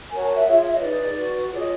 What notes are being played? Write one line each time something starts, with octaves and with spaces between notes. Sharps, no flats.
F#4 A#4 C#5 G#5
A5
E5
F4 G#4 C#5 E5
E5
D#5
D#4 G#4 B4 D5
F#4 B4
F4 G#4 C#5 D5
D#5